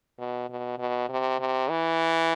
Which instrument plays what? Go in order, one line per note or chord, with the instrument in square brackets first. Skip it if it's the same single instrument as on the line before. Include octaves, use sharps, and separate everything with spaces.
[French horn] B2
B2
B2
C3
C3
E3